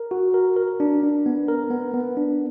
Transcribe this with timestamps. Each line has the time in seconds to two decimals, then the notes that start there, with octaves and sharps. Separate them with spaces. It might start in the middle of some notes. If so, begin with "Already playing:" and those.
Already playing: A#4
0.11 F#4
0.34 A#4
0.56 A#4
0.80 D4
1.03 D4
1.26 B3
1.48 A#4
1.71 B3
1.94 B3
2.17 D4